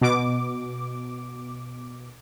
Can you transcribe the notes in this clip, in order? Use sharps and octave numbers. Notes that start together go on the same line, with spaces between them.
B2 D6